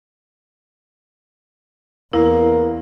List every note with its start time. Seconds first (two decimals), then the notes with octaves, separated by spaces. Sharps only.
2.13 E2 A#3 E4